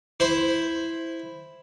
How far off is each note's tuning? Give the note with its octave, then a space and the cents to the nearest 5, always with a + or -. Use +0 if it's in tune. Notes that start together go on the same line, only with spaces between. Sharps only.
E4 +0 C5 +0 C6 +0